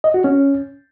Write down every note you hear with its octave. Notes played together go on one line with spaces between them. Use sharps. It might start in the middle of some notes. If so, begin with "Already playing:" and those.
D#5
F#4
C#4